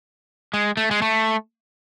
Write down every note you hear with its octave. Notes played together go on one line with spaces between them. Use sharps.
G#3
A3
G#3
A3